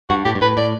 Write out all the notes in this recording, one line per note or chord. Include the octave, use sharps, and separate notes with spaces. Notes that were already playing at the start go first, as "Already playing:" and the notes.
G2 F#4
A2 G4
G2
A2 B4
A2 D5